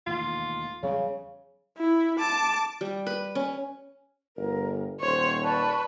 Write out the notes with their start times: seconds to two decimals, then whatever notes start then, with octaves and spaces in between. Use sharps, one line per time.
0.07 E1 D#2 A2 F4
0.83 E2 C#3 F#3 G3
1.78 E4
2.19 A5 D6
2.81 G3
3.07 B4
3.35 C#4
4.37 G1 A#4
5.00 D#1 C5 C#5
5.44 B4 D5 A5 C#6